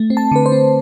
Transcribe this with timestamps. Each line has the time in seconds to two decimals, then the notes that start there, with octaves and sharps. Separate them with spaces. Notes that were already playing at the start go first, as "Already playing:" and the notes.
Already playing: A3
0.10 C4
0.17 A5
0.32 D3 B4
0.46 C5
0.52 C4